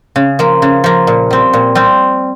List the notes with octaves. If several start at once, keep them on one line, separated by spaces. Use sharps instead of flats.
C#3
F3 A#3
C#3
F3 A#3
A#2
G3 C4
A#2
G3 C4